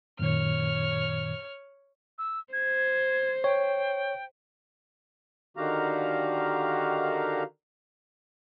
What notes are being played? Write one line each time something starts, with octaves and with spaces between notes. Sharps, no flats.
F#2 A#2 D#3 C#5 F6
E6
C5 G#6
C#5 G5
D3 D#3 F#4 G4 F5 A#5